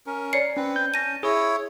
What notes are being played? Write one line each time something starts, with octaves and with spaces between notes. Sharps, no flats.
C#4 A#4
C#5 D5 C7 C#7
C4 C#4 B4
G6
C#4 A5 A#6 D#7
E4 G#4 C#5